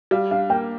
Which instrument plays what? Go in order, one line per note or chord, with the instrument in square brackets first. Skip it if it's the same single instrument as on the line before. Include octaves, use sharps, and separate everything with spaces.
[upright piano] G3 [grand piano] F5
[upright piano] D4 [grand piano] F5
[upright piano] A#3 [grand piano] G5